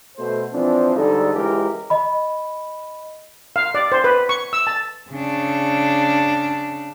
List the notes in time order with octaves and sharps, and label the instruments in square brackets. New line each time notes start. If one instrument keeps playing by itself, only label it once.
[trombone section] B2 A3 C5
E3 F3 C4 D4
G#2 D3 G3 D#4 G#4 A4
C#2 E3 G#3 G4 A#4
[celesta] D#5 B5
[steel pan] F5
D5
C5
B4
C#6
E6
A5
[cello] C#3 D4